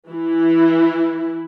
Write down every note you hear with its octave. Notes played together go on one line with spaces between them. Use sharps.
E3 E4